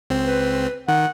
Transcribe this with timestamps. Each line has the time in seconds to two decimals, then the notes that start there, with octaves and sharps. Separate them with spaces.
0.10 C#2 C4
0.26 B4
0.88 D#3 F#5